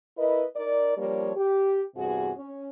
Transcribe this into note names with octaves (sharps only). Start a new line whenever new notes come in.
E4 A#4 B4 D#5
D#4 A#4 D5
F3 G3 A#3 D4 C#5
G4
E2 G2 C3 F#4 G#4
C#4